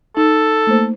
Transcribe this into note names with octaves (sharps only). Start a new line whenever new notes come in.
D#4 A4
A3 A#3 C5